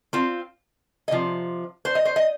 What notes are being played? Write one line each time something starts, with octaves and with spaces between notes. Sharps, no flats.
C4 F4
D#5
C3 F3
C5
D#5
C5
D#5